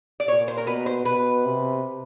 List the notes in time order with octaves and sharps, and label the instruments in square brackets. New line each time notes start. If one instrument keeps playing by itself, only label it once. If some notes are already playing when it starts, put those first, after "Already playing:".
[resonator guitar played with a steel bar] D5
[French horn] A#2 [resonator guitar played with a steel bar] C#5
[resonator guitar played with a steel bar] C5
A#4
[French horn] B2 [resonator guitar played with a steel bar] B4
[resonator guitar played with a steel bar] C5
[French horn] B2 [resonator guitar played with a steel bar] B4
[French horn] C3